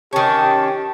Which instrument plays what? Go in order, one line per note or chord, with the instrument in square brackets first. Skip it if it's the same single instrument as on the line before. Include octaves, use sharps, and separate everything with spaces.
[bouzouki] D#3 C#4 [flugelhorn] G4 [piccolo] A5